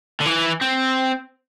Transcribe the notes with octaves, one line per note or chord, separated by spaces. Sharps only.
D3
E3
C4